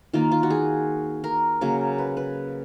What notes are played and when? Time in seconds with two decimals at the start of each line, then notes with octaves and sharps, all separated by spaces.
0.13 D#3 A#3 F4
0.31 F4
0.43 F#4
0.50 G#4
1.24 A#4
1.61 C#3 F#3 A#3
1.98 B4
2.17 B4